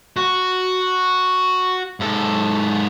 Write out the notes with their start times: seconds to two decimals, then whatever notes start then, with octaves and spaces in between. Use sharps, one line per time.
0.17 F#4
2.00 G#2 A4